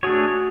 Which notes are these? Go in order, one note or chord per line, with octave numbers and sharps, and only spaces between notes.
A3 D4 F#4 G#4 C#5